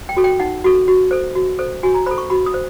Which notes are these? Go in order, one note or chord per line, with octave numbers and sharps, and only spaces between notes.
G5
F#4 A4
G5
D#4 F#5
F#4 A4
F#4
A4 C5
F#4
A4 C5
F#4 G#5
A#5
A4 C5 B5
C#6
F#4 B5
D#6
C5